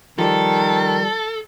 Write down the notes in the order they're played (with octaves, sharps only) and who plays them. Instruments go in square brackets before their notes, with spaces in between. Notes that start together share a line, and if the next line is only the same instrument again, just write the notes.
[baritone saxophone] D#3 [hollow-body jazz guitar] F3 G3 [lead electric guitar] A4